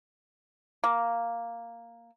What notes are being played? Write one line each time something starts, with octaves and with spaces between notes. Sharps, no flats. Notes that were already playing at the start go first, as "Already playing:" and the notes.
A#3